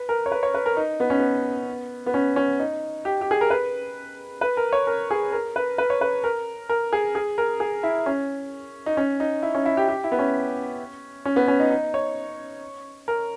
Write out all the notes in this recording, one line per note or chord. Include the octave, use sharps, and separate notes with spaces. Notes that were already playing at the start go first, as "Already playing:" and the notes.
Already playing: B4
A#4
C#5
B4
C#5
B4
A#4
D#4
B3
C#4
B3
B3
C#4
C#4
D#4
G4
G4
G#4
A#4
B4
B4
A#4
C#5
A#4
G#4
A#4
B4
B4
C#5
B4
A#4
A#4
G#4
G#4
A#4
G#4
E4
C#4
D#4
C#4
D#4
E4
C#4
E4
G4
G4
E4
B3
C#4
C#4
B3
C#4
D#4
D#4
C#5
A#4